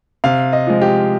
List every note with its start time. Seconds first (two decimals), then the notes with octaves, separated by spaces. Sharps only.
0.24 C3 F5
0.53 D#5
0.67 F3 G#3
0.81 G4